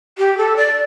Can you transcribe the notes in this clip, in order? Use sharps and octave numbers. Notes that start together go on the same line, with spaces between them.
G4
A4
D5